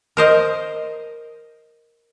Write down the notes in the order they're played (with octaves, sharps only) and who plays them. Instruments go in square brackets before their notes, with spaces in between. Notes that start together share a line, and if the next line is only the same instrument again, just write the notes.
[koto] A#4 C5 D#5